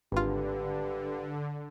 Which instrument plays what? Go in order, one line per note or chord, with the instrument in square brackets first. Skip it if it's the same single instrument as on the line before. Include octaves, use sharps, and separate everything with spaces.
[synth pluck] G#1 F4 [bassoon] G2 [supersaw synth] D3